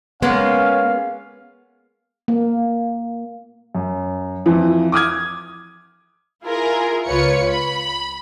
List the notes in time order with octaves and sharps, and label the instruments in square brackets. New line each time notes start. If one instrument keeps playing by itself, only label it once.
[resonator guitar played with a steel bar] G#3 A#3 [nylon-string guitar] B3 [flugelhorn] C#4 [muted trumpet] F5
[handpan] A#3
[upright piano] F#2
F2 E3 F3
D6 D#6 F6 G#6
[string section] E4 F4 G#4 A#4
C#2 F4 B4 C#5 C#7
B5